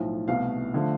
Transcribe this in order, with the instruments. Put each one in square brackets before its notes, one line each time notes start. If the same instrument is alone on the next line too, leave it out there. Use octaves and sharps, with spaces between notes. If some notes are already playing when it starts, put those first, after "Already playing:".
Already playing: [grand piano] B1 A2 F3 A3
C2 B2 A3 F5
D3 F3 A3